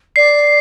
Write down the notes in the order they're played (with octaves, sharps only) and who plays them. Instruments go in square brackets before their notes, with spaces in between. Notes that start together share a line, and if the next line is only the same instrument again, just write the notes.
[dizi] D5 [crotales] C7